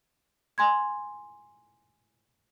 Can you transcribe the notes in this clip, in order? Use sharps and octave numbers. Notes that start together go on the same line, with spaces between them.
G#5 C6 G#6